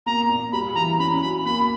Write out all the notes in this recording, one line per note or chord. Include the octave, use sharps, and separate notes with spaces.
A#3 A#5
A#2
G3 B5
E3 A#5
C#4 B5
F#3 B5
A#3 B5